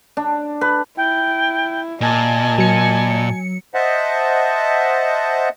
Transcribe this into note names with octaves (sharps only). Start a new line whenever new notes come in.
D4
B4
E4 G5
A#2 D#5 G#5 A5
F#3 C#7
C5 D#5 E5 F#5 A5